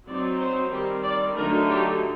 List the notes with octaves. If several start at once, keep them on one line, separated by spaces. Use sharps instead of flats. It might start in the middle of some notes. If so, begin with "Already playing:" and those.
F#3 C4 D#4 D5
C5
D#3 G3 C4 G4
D5
D3 F#3 A3 D#4 A#4
G4